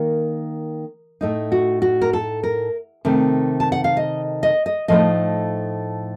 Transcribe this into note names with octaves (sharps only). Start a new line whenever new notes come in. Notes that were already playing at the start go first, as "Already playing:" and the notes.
Already playing: D#3 A#3 A#4
A2 A3 D#4
F#4
F#4
A#4
A4
A#4
C3 D#3 A3
A5
F#5
F5
D#5
D#5
D#5
A2 F3 A3 D#4 D#5